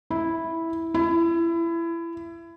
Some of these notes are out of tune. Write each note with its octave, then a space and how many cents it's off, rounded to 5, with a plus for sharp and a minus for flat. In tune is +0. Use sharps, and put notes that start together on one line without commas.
E4 -5
E4 +25